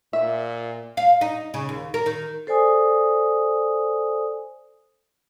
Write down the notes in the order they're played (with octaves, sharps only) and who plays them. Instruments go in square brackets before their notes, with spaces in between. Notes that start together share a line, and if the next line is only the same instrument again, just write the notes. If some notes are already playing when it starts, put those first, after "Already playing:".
[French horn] A#2 [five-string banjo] E5
[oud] F5
D#4
C#3
D#2
A#4
D#3
[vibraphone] A4 C5 D5 G#5 D#6